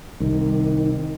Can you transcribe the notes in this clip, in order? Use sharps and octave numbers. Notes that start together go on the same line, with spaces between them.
C2 D#3